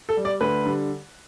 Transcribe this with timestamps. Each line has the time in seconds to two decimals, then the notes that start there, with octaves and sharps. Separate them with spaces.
0.09 A4
0.17 G3
0.25 D5
0.41 D2 B4
0.65 D3 G3